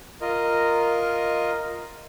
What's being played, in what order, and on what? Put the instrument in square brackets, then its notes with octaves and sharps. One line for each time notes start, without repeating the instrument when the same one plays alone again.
[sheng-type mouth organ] F4 A#4 D#5